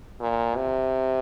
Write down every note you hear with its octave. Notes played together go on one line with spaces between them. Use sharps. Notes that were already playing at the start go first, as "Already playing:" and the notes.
A#2
C3